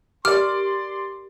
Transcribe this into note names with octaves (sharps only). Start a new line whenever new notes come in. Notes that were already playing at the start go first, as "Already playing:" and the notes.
G4 A#4 D5 C6 D6 F6